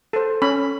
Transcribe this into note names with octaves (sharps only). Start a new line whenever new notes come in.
A4 C5
C#4 B5